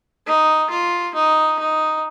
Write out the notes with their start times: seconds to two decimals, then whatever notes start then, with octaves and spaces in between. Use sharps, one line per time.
0.26 D#4
0.70 F4
1.15 D#4
1.59 D#4